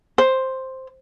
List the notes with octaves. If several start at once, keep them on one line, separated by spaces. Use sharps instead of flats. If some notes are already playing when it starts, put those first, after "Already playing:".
C5